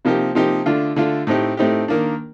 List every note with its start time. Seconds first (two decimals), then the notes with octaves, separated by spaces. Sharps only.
0.05 C3 F3 A#3 D#4 G4
0.35 C3 F3 A#3 D#4 G4
0.66 D3 A3 D4 F4
0.96 D3 A3 D4 F4
1.27 A2 A3 C4 D#4 G4
1.57 A2 A3 C4 D#4 G4
1.88 D#3 A#3 D4